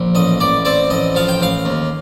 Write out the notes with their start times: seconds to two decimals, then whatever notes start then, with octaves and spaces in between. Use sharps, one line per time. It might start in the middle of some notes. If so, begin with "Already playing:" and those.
Already playing: A#1
0.15 A1 D#5
0.40 A1 D5
0.65 C4 D5
0.90 A1 D#5
1.15 F3 F5
1.28 G5
1.40 A1 F5
1.65 D#2